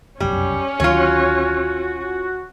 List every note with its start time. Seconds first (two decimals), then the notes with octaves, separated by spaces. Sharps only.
0.20 F1 B1 F#2 G3 C#4
0.80 D2 D#3 F#3 F4 F#4 C#5